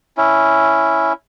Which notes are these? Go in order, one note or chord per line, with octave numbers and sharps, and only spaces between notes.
C#4 E4